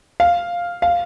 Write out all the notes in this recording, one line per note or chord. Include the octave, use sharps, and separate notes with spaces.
F5
F5